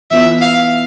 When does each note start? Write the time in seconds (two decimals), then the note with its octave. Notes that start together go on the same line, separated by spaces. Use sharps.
0.11 E3 B3 F4 E5
0.41 F5